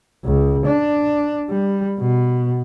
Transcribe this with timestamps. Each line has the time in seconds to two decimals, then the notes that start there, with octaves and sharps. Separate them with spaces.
0.25 C#2
0.66 D4
1.50 G3
2.00 B2